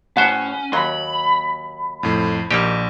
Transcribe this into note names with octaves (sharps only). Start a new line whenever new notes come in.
A2 C#4 C5 F#5
D#2 F#3 B5 C6
F2 A2
A#1 A#3 D#4 G4